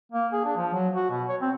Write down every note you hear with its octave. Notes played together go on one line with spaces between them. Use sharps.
A#3
G#4
D4
F3
F#3
F#4
B2
C#5
C4